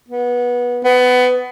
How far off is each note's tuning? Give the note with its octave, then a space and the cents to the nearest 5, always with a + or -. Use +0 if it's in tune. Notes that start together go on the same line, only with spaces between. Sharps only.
B3 -20
B3 +20